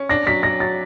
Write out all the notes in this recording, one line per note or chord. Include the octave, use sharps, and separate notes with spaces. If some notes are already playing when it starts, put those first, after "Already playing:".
Already playing: C#4
D4 A#6
F#3 B6
F#3 A#6
F#3 A6